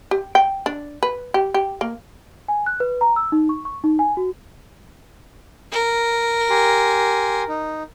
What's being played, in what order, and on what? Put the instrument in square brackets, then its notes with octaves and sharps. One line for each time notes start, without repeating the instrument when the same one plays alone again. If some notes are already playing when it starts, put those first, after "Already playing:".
[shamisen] G4
G5
D4
B4
G4
G4
A#3
[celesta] G#5
F#6
B4
A#5
E6
D#4
C#6
C#6
D#4
G#5
F#4
[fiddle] A#4
[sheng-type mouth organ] G4 G#5 C6
D#4